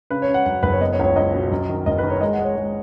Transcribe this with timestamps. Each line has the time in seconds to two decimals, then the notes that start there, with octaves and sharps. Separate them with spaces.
0.11 C#3 B4
0.22 C#5
0.29 C#3
0.34 F#5
0.46 F#2 F#5
0.63 F#1 B4
0.72 C#5
0.80 B3 D#5
0.93 C#5
0.99 C#2
1.04 C#5
1.16 C#2 D#5
1.34 B2
1.51 F#2
1.69 D#3
1.86 F#1 D#5
1.98 D#3 B4
2.10 C#5
2.21 G#3 D#5
2.33 F#5
2.39 G#3 C#5
2.56 G#3